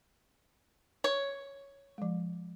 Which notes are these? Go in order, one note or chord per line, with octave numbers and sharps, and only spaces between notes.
C#5
F3 G#3